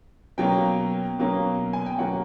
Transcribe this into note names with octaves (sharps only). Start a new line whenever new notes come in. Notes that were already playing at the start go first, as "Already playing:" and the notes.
B2 F#3 A#3 C#4 G5
B2 F#3 A#3 C#4
G#5
G5
B2 F#3 A#3 C#4 F#5